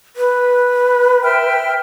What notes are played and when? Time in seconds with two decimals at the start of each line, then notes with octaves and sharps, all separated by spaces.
0.16 B4
1.22 E5 G5 F6